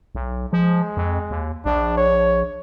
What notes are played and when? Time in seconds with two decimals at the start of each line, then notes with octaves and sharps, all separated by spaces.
0.15 B1
0.53 F3 G#3
0.97 F2
1.31 D#2
1.66 A#1 D4
1.97 C#5